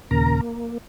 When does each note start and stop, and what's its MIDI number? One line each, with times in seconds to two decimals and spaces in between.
0.11 0.41 39
0.11 0.41 46
0.11 0.41 49
0.11 0.41 70
0.11 0.41 82
0.41 0.78 58